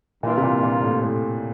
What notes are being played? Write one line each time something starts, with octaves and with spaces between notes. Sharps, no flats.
G2 A#2 E3 A#3 F4
C3
A#2
A#2
A2
A2